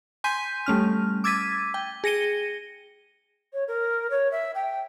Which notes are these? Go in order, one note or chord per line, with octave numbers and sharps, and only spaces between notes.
G#5 C6 G6 B6 D#7
G3 A3 C#4 F6
D6 E6 G#6 A6 B6 D#7
G5
G#4 A#6 C#7 D#7 G7
C#5
A#4
C#5
E5
G5